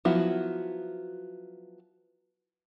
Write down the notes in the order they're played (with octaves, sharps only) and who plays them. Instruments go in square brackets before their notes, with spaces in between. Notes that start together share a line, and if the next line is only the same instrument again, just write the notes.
[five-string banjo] F3 F#3 B3 E4 F#4